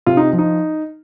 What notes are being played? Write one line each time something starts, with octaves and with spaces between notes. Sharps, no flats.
C3 F4
D#4
F3
D#4